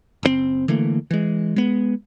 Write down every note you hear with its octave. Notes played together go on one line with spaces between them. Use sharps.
F#1 C#3 C4
D3 E3 A3 A#3
E3 G#3
G#3 B3